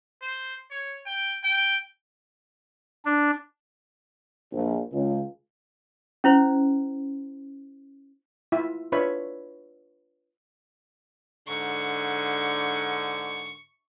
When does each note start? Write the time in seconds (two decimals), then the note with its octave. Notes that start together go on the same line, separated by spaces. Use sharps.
0.22 C5
0.71 C#5
1.06 G5
1.44 G5
3.05 D4
4.53 A#1
4.93 C#2
6.24 C#4 E4 C5
8.52 E4 F4 E5
8.92 D4 F4 B4 C#5 E5 B5
11.48 G#2 D3 C#6